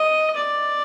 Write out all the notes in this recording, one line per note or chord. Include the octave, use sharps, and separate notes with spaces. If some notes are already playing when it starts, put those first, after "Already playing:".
Already playing: D#5
D5